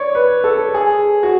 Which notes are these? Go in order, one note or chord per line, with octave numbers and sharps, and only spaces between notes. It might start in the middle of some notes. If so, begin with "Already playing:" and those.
Already playing: C#5 D5
B4
A4
G#4
F#4